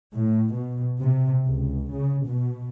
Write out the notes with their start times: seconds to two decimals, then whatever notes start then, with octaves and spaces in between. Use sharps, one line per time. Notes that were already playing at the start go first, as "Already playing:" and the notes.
0.12 A2
0.54 B2
0.99 C3
1.46 C#2
1.91 C#3
2.28 B2